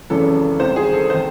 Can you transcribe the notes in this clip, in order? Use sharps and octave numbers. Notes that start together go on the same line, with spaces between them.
G#1 F#2 C#3 E3 A4
C2 C3 D#3 C5
G#4
A4
C3 D#3 C5